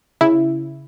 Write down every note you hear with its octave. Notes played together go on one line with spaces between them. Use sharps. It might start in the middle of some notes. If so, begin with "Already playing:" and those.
C#3 E4